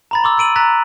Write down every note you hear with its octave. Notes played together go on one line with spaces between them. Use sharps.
A#5 B5 A6
C6 D6 E6
E6 A6 D7 D#7 F#7
A#5 F#6 A6 B6